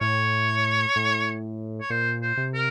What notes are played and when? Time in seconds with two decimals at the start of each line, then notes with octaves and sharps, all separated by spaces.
0.01 A2 C#5
0.96 A2
1.81 C#5
1.90 A#2 C5
2.22 C5
2.37 C3
2.54 A#4